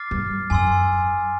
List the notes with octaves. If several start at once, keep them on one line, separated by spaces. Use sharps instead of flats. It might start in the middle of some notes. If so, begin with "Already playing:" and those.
Already playing: D6 F6 A6 C7
G2
F#2 G#5 C6 E6